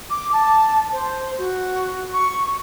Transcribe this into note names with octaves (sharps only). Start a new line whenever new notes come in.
D6
A5
C5
F#4
C#6